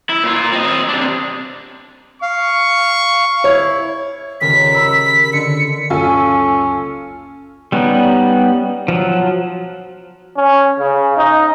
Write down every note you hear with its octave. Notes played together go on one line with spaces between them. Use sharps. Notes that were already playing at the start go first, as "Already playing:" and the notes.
E4
A#2 F4
C4 D#5
C3 D4
F5 C#6
E4 C#5
D#1 C#3 A#4 B6
B5 E6 C#7
D3 C#7
F#1 C#2 C#4 F4 A4 G#5
G3 B3 C#4 D#4
F3 F#3
C#4
C#3
D#4